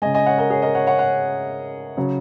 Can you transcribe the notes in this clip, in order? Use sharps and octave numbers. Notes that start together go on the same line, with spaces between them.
C#3 G#3 D#5 G#5
D#5 G#5
C#5 F#5
A#4 D#5
G#4 C#5
A#4 D#5
C#5 F#5
C#5 F#5
C#5 F#5
C#3 F#3